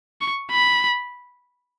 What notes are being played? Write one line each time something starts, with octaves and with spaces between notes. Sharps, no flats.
C#6
B5